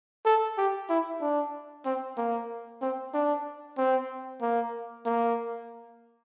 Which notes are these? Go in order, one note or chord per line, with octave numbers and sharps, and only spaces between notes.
A4
G4
E4
D4
C4
A#3
C4
D4
C4
A#3
A#3